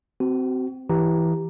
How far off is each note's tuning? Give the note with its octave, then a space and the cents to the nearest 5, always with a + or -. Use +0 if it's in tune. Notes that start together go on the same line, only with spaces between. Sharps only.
C4 -15 F#4 +30
E3 +0 G4 +0 A#5 +0